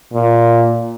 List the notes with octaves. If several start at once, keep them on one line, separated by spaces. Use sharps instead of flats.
A#2